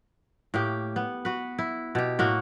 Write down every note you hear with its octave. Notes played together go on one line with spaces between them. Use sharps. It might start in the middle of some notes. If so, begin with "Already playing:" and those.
A2 A#3 G4
B3
F#4 B4
E4
B2 G4
A2 A#3 F#4